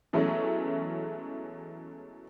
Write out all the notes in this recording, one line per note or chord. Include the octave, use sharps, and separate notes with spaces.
B2 E3 F#3 G#3 A3 C#4